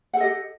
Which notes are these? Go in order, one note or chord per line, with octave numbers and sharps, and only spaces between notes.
G4 A4 D#5 F#5